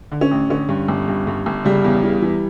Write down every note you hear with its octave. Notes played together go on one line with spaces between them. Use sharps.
D3
C#4
A1
D3 C#4
G2
G1
G2
G2
G1
C#3 G3
E2
E3
E3